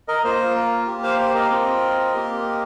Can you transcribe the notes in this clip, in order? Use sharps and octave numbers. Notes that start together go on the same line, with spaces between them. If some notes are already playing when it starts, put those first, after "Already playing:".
A#4 D#5
A#3 F4 C5
A#4
A#3 G4
C5 F5
C5
A#4 D#5
C4 F4
A#3 G4